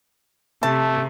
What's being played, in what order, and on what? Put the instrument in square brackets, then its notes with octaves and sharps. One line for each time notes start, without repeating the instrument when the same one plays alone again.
[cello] C3 [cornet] A3 [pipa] A5